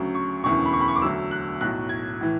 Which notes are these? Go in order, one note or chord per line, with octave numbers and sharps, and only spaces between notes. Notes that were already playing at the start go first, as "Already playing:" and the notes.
Already playing: D2 C#3 F#3
C#6
E1 D2 C#3 E3 C#6
B5
C#6
B5
C#6
D6
D2 D3 F#3 E6
F#6
B1 A2 F#3 F#6
G#6
A2 E3